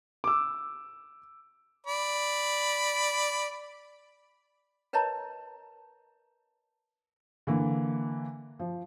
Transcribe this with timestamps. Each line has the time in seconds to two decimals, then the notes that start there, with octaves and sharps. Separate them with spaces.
0.24 D6 E6
1.86 D5 B5
4.93 A#4 B4 C#5 D#5 A5 A#5
7.47 D3 E3 A#3
8.59 F3